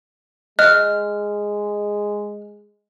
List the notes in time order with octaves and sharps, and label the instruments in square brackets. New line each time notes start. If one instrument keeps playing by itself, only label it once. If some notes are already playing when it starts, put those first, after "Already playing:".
[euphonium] G#3 [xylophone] D#5 F#6 [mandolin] F6